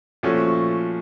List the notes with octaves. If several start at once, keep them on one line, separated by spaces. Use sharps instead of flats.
A#2 F3 A3 C#4 F#4